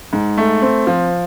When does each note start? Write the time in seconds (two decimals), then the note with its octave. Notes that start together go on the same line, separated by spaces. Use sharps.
0.13 G#2
0.37 A3
0.62 C4
0.87 F3